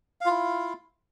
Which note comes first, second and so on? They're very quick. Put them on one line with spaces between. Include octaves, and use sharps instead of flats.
F5 F4 E4